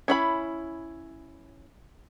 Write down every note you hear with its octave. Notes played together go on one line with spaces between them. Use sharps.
C#4 E4 B5